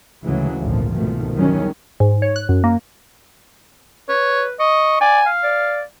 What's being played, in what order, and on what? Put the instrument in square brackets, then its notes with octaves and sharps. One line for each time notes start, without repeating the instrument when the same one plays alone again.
[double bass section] D2 C#3 E3 F#3 G#3
G#1 D2 A#2 F3
C2 G#2 B2 D#3 F3 A3
E2 D#3 F#3 G3 C#4
[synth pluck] G#2
C#5
F#6
F#2
A#3
[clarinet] B4 [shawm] C#5
[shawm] D#5 [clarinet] C#6
[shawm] D5 [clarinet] G#5
[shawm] F5
[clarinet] D5